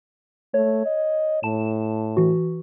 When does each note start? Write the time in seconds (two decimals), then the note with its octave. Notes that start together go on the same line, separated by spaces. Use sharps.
0.54 A3 C#5
0.86 D#5
1.43 A2 A5 E7
2.17 E3 F#4